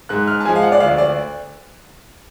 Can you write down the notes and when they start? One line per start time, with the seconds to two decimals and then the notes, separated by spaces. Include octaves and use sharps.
0.09 G#2 F#6
0.28 F6
0.40 A5
0.45 F3 G#3 G#5
0.56 F5
0.62 F#5
0.72 D5
0.80 D2 F5
0.98 D5